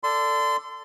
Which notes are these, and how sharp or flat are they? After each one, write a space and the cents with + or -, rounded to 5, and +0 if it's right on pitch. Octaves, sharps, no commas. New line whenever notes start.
A4 +15 D5 +0 C6 -25